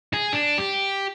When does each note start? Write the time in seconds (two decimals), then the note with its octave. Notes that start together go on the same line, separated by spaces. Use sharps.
0.14 G#4
0.33 D4
0.58 G4